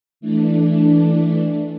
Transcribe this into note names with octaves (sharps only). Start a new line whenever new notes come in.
E3 A3 D4